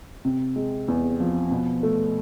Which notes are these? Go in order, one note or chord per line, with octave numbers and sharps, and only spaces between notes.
C3
G#3
E2
F3
B2
A3